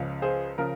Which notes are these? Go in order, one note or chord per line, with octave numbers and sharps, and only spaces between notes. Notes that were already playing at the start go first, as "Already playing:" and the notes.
Already playing: C#2 C#3 F3
G#4 C5
C#3 F3 A#4